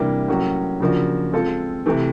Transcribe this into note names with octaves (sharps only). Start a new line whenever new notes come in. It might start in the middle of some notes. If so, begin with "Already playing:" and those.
Already playing: C3 E3 G3 A#3 D4
A2 F#3 A#3 C#4 F#4
C#3 F3 A#3 D4 F#4
G#3 C4 F4 A4
C3 E3 A3